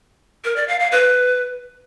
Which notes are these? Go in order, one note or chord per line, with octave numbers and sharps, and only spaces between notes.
A#4
D5
F5
F5
B4